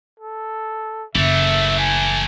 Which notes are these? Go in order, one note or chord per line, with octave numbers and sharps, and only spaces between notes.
A4
F#1 E3 A3 E5
G#5